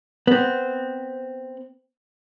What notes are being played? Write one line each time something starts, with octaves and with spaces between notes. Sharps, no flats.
B3 C4